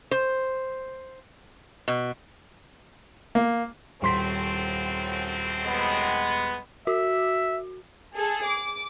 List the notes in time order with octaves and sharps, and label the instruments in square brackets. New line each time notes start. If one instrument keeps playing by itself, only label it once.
[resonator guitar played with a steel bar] C5
B2
[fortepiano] A#3
[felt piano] D#1 C6 B6 [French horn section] F#2 A2 C4
[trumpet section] G#3 B3
[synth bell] F#4 [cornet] E5
[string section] G#4 A4
D6